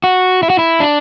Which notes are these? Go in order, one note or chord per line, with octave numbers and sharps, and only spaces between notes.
F#4
E4
F#4
E4
D4